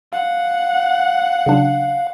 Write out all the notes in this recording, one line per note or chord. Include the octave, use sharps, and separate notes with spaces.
F5 F#5
C#3 F#3 D4